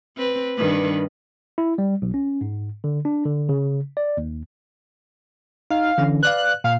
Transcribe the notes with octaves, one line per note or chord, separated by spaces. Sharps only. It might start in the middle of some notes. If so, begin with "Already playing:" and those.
C4 B4
G2 D#3 B4
E4
G3
B1
C#4
G#2
D3
D4
D3
C#3
D5
D#2
D#4 F5
D3 E3 C#4
B4 D5 F5 F#6
A#2 F5